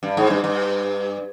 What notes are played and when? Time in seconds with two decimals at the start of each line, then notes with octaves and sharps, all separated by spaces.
0.03 G2
0.17 G#2
0.30 G2
0.44 G2